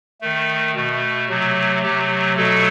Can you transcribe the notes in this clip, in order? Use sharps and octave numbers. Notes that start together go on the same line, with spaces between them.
D#3 A3
B2 A3
C3 F#3 A3
C3 F#3 A3 G4
B2 F#3 A3 A4